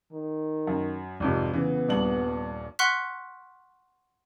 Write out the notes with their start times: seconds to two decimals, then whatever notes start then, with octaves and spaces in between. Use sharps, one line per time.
0.12 D#3
0.67 F#2
1.20 G#1 F2 C3
1.53 C#3 E3 B3
1.89 D#1 G2 F#7
2.79 F#5 C6 C#6 F6 F#6 B6